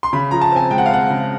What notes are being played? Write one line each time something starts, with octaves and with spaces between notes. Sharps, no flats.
C6
C#3 B5
F3 A#5
A5
C4 G#5
G#3 G5
F#5
F5
C4 F#5
C#3